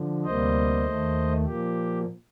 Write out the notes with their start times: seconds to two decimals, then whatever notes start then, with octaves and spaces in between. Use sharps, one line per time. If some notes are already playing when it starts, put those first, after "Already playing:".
Already playing: D3 F3
0.24 D2 C3 G3 A#3 C5 D#5
0.84 D#2 D#3 A3
1.45 A#2 F3 A#3 G4